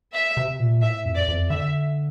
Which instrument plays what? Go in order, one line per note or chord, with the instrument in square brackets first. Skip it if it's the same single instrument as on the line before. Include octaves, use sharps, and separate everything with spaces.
[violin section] E5
[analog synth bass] C3
A#2
[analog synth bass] A2 [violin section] E5
[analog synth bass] F2
[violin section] D5
[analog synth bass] F2
[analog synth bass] D3 [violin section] E5